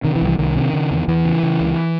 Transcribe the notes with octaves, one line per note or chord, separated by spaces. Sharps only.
C3 D#3
E3
C2
E3
C2 D#3
C3
C#3
E2
E2 E3
C#3
C#3
C#2